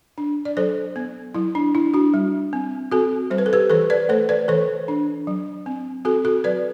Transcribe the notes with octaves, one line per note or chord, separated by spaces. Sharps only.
D4
D5
F#3 A4 C5
B3
F#3 E4
D4
D4 E4
D4 F#4
G3
C4
C4 F#4 A4
G3 C5
B4
A4
G4 B4
E3 A4 C5
B4 D5
A3 A4 C5
B4 D5
E3 A4 C5
D4
F#3
C4
C4 F#4 A4
F#4 A4
F#3 B4 D5